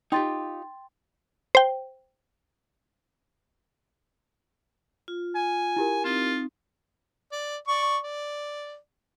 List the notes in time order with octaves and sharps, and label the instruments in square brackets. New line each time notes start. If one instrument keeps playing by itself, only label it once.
[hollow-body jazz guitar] D#4 F4 G4 [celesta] G5 C6 A6
[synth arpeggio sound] C5 G5
[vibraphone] F4
[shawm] G#5
[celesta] E4 G4 A#4
[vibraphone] C4 D#4 [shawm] F4
[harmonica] D5
D5 C#6
D5